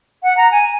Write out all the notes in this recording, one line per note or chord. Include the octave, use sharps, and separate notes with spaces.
F#5
A#5
G#5